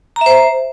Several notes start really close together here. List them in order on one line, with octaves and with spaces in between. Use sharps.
A#5 E5 C5